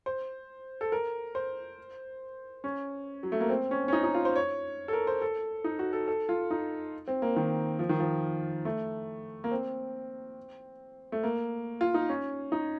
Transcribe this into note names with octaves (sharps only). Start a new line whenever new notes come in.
C5
A4
A#4
C5
C#4
F#3
A3
A#3
C4
C#4
C#4
D#4
D#4
F4
C5
C#5
A4
A#4
C5
A4
D#4
F#4
A4
A4
F4
D#4
C4
A#3
D#3
F3
D#3
F3
A3
A#3
C4
A3
A#3
F4
D#4
C#4
D#4